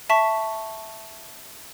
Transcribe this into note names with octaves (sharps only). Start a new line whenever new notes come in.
E5 A5 C#6 B6